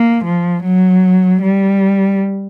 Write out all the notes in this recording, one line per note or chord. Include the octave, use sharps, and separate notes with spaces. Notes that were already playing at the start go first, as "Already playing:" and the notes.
Already playing: A#3
F3
F#3
G3